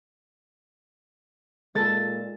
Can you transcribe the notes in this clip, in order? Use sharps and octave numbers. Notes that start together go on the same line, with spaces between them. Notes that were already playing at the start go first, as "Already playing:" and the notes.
A#2 G#3 A4 A6